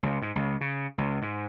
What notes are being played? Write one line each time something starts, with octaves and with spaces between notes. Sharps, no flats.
C#2
G#2
C#2
C#3
C#2
G#2